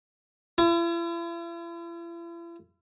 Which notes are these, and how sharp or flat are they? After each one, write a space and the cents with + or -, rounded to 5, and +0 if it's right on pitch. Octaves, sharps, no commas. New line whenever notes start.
E4 +45